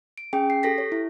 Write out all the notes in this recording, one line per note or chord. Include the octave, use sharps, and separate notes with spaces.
D7
C#4 G#4 G5
C7
G4 A4 A#6 B6
C#5
E4